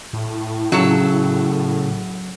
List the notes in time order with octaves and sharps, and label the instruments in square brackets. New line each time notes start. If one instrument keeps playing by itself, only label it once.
[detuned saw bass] A2
[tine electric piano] C#3 [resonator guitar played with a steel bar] F#3 A4